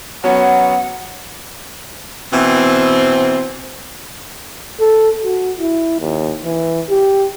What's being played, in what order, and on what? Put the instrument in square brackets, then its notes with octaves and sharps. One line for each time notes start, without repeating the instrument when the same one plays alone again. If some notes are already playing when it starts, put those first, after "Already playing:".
[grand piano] F#3 B3 C#4 [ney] F#5
[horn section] B2 E3 C4
[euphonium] A4
F#4
E4
D#2
E3
G4